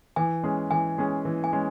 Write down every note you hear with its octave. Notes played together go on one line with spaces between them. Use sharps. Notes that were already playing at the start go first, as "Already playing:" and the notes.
E3 G#5
G#3 C#4 G#4
E3 G#5
G#3 C#4 G#4
E3
G#5
G#3 C#4